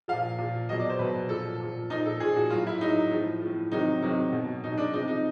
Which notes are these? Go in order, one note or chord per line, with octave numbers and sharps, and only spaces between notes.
A#2 F3 F5
A#2 F3
B2 F#3 D#5
D5
C5
B2 F#3 B4
A#2 F3 A4
A#2 F3
A#2 F3 D#4
A4
A#2 F3 G#4
F#4
A2 F#3 F4
E4
A2 F#3 D#4
A2 F3
F3
A2
C3 D#3 F#3 D#4
C3 D#3 F#3 D#4
B2 F#3
B2 F#3 D#4
D4
C3 F3 D#4
D#4